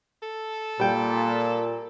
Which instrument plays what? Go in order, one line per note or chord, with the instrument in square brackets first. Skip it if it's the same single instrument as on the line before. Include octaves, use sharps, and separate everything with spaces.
[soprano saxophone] A4
[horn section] A#2 [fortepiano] G3 G5